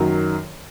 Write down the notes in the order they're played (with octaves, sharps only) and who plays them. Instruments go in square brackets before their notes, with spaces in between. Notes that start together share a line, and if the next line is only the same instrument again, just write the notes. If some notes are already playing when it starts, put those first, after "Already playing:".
Already playing: [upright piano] F#2 D#3 F#3